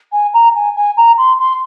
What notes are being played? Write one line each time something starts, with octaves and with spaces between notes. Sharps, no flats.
G#5
A#5
G#5
G#5
A#5
C6
C6